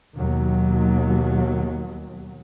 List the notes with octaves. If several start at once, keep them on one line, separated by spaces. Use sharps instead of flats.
D#2 B2 F#3